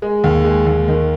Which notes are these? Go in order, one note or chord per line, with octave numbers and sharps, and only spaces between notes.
G#3
D#2
G#3
D#2
D#3